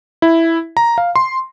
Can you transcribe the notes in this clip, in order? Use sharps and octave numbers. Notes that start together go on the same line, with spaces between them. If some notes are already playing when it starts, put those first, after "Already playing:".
E4
A#5
F5
C6